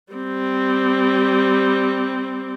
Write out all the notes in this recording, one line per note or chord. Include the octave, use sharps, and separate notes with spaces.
G3 C4